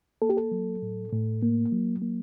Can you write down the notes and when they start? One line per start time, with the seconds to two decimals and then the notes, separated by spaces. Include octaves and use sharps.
0.22 A#3 A4
0.30 G4
0.37 A4
0.52 F#3
0.82 A2
1.12 A2
1.42 A#3
1.72 F#3
2.02 A#3